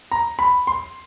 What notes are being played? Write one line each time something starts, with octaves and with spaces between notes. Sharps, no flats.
A#5
B5
C6